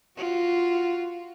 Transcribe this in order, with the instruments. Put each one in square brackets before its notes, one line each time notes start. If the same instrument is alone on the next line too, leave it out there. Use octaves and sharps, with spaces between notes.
[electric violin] F4 F#4